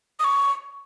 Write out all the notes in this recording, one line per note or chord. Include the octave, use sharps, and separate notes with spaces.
D#6
C#6